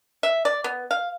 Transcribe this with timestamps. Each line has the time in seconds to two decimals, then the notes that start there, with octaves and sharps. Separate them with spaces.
0.23 E5
0.45 D5
0.64 B3
0.91 F5